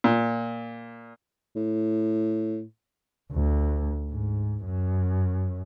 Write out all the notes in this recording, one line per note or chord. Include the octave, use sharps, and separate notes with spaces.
A#2
A2
D2
G#2
F#2